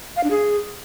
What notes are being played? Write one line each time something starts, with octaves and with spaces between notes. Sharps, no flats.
F5
D4
G#4